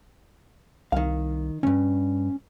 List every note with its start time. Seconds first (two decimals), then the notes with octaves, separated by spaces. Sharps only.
0.92 C2 D#3 F5
1.63 C#2 G2 C#4